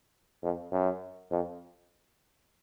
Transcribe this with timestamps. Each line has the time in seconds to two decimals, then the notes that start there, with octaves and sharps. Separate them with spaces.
0.43 F2
0.72 F#2
1.31 F2